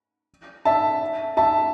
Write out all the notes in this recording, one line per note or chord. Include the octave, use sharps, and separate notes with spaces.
E5 A5
E5 A5